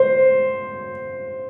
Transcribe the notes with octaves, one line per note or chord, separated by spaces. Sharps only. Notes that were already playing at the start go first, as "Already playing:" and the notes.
Already playing: C5